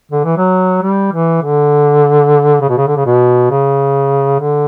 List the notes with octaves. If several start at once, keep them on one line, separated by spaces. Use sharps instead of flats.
D3
E3
F#3
G3
E3
D3
C#3
B2
C#3
D3
C#3
B2
C#3
D3